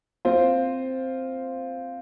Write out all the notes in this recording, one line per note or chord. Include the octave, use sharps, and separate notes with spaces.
C4 F4 C5